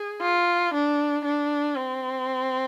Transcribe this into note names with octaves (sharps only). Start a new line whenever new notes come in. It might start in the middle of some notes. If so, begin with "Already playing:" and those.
Already playing: G#4
F4
D4
D4
C4